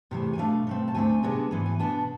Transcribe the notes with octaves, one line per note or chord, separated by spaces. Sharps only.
E2 C3 E3 A3
G#5
B2 A3 D4 F5
B2 A3 C4
A5
D2 D3 A3 C4 G#5
C3 G#3 B3 D4
G#2 E3 B3
G#5
B2 B3 D4 A5